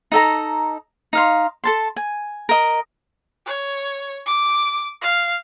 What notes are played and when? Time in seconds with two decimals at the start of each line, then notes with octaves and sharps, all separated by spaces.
0.12 D#4 A4 A#5
1.13 D#4 F5 C6
1.64 A4 A5 C6
1.96 G#5
2.49 A#4 D#5
3.46 C#5
4.26 D6
5.02 F5